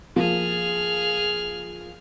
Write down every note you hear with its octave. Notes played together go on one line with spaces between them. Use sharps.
F3 A#3 G#4 F6